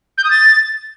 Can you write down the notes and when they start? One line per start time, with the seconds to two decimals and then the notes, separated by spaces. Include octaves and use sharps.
0.18 G6
0.24 D#6
0.31 A6